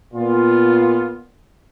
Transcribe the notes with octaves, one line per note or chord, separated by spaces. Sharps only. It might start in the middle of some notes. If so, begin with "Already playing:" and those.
A#2 B3 F4